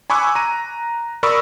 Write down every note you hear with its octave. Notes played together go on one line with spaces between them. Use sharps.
G#5 B5 C#6 D6 E6 F#6
A#5 D#7
A#4 D5 B5 C#6 D#6 E6